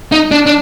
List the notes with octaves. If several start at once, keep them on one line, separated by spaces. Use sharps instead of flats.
D#4
D4
D4